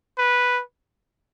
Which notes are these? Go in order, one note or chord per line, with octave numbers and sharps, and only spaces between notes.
B4